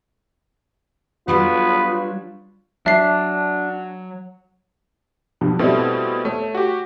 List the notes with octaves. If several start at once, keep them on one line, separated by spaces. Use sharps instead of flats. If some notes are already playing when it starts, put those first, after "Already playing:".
F#3 G3 B3 D4 F4 B4
F#3 D4 E5 C7
G2 B2 F3
B2 G3 A3 C4 E4 A4
A3 C#5
F#4 G4